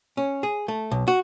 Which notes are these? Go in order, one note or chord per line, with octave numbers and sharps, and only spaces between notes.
C#4
G#4
A3
B1
F#4